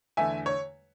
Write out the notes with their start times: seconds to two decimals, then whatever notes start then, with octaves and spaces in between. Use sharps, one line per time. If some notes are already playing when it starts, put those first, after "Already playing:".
0.17 E2 D3 A3 E5 G#5
0.46 C#5